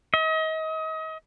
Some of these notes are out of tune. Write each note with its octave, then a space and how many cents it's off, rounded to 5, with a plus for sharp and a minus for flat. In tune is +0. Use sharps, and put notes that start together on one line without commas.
D#5 +35